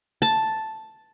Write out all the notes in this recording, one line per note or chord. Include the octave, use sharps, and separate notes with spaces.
A5